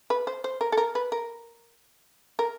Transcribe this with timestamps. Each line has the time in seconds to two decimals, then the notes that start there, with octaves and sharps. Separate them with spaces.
0.10 B4
0.27 C5
0.44 C5
0.61 A#4
0.72 A4
0.77 A#4
0.95 B4
1.12 A#4
2.39 A#4